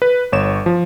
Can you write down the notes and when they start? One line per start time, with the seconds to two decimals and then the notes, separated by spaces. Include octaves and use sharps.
0.02 B4
0.32 G1 C#5 E7
0.66 F3